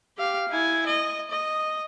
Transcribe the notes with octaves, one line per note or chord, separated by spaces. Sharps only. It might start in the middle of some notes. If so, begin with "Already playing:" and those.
G4 F5
E4 G#5
D#5
D#5